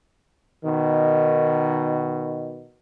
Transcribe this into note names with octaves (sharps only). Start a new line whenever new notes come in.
B2 D#3